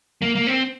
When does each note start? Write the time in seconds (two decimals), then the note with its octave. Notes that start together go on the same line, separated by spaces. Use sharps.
0.22 A#3
0.35 A#3
0.47 C4